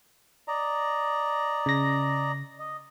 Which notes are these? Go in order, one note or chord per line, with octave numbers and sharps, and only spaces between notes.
D5 D#5 A#5
C#3 A#6
D#5